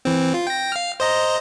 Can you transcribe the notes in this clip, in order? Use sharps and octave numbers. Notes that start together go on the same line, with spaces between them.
E3 C4
F4
G5 A#6
F5 F6
C5 D#5 A#5